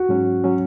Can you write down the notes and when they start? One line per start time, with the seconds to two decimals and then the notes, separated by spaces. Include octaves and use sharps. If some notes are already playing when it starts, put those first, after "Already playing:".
Already playing: F#4
0.09 G#2 F#3 C#4
0.44 F#3 C#4